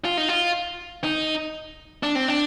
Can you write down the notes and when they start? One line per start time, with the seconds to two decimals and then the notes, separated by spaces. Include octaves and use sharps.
0.05 F4
0.18 D#4
0.28 F4
1.04 D#4
2.03 D4
2.15 C4
2.28 D4